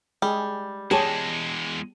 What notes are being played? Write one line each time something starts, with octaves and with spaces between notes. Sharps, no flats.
G3 G#3 G#4
E2 G#3 G4 G#4 C#5 A5